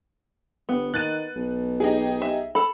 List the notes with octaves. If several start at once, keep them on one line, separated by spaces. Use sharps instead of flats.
G1 B3
D#3 F#6 A6 D#7
B1
D#4 G4 G#4
E5
A4 B5